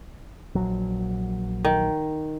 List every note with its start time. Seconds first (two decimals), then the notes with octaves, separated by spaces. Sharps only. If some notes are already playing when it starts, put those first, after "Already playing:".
0.55 A#1 F#3
1.65 D#3